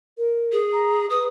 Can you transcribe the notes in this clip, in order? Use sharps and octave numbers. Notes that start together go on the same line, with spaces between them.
A#4
G#4
A#5
B4 D#6